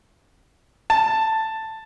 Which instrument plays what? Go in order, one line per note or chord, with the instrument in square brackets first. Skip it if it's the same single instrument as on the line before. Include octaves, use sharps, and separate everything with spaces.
[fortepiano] A5